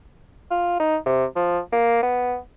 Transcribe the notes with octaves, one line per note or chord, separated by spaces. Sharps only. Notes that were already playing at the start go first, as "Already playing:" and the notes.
F4
D#4
C3
F3
A#3
B3